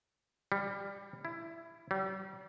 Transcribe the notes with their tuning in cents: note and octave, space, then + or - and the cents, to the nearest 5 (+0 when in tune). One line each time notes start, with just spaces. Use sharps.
G3 +15
E4 +15
G3 -40